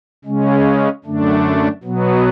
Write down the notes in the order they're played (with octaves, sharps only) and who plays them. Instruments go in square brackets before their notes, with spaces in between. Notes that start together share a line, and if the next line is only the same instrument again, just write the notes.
[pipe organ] C#3 G#3 C#4
F#2 D3 A3 D4
B2 F#3 B3